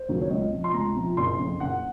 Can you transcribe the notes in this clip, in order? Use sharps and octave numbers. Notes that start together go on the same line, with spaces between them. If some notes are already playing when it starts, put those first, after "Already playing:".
Already playing: C5
D#2 C#3 F#3 A#3
C#5
C#2 D#5
C3 F3
C6
C#2 A#5
C3 F3
F#1 C6
F2 C#3
F#1 F#5